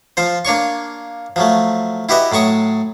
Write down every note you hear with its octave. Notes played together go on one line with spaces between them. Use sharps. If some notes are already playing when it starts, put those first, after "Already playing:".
F3 F4 C5
A#3 D4 C#5 C#6
F3 F#3 A3
E4 F#4 G4 B4 D#5 E5
A2 F#3 A5 C#6 D#6